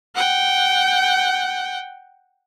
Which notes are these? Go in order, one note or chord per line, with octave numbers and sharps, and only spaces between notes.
F#5 G5